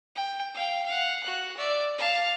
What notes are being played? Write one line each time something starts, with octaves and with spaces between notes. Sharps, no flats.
G5
F5 G5
F5 F#5
F#4 F#6
D5 E5
F5 A5